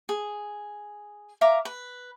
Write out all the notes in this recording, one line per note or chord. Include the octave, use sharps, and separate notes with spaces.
G#4
E5 F5 A#5 D6
B4